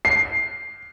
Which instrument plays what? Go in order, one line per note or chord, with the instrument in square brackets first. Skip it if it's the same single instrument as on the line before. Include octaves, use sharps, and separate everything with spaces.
[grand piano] C7